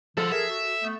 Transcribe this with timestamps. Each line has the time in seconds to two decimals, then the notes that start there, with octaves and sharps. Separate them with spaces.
0.17 D3 F3 A4
0.32 G#4 A#4 E5
0.49 F#4
0.82 A3 B3